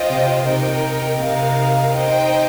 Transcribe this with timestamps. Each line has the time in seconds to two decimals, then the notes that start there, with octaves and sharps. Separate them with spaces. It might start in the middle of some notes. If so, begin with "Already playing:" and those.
Already playing: F4 C5 D#5 G5
0.10 C3
0.45 C3 D#4 A#4 G5
1.19 C3 D#4 A#4 F5
1.93 C4 D#4 C5 D#5 G5